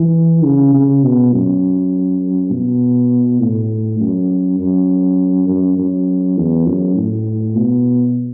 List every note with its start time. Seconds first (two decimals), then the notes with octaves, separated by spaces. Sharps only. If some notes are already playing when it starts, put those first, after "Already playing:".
Already playing: E3
0.44 C#3
0.74 C#3
1.04 B2
1.33 F#2
2.52 B2
3.40 A2
4.00 F#2
4.59 F#2
5.48 F#2
5.78 F#2
6.37 E2
6.66 F#2
6.96 A2
7.56 B2